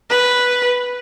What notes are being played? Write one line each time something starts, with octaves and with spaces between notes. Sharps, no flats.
B4